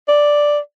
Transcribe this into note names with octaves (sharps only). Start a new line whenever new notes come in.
D5